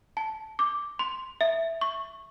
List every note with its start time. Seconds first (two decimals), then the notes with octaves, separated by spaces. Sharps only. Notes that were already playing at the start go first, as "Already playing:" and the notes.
0.17 A5
0.59 D6
0.99 C6
1.41 E5
1.81 C#6